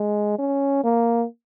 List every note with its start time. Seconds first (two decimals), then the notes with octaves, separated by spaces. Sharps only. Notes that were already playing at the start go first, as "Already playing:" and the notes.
Already playing: G#3
0.38 C#4
0.84 A#3